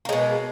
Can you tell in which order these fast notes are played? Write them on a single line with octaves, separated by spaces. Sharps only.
A#3 G#3 B2